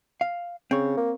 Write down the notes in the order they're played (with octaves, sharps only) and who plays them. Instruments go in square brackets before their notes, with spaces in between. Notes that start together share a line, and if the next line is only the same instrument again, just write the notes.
[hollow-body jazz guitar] F5
[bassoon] C#3 [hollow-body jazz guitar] C4 C#5
[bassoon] A#3